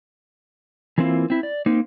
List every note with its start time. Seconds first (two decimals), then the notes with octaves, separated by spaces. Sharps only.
0.98 E3 F#3 A#3 C4 E4 F4
1.30 C4 E4
1.43 D5
1.66 A#3 C4 D#4